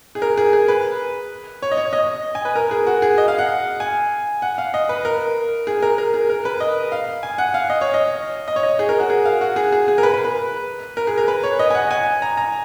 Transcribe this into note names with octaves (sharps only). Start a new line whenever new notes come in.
G#4
A#4
G#4
G#4
B4
C#5
D#5
C#5
D#5
G#5
B4
A#4
G#4
F#4
G#4
D#5
F5
F#5
G#5
F#5
F5
D#5
B4
A#4
G#4
A#4
A#4
G#4
A#4
B4
D#5
F5
G#5
F#5
F5
D#5
C#5
D#5
D#5
C#5
D#5
G#4
A#4
F#4
G#4
F5
F#4
G#4
G#4
G#4
A#4
B4
B4
B4
A#4
G#4
A#4
B4
C#5
D#5
G#5
F#5
G#5
A#5
A#5